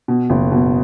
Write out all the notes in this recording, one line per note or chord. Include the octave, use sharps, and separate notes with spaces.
B2
F#1
B2